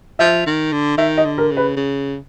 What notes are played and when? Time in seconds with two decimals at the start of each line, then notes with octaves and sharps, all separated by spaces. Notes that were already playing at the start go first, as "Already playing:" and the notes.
0.19 F3 E5
0.46 D#3
0.73 D3
0.98 D#3 E5
1.18 D#5
1.25 D3
1.38 A#4
1.51 C#3
1.57 B4
1.77 C#3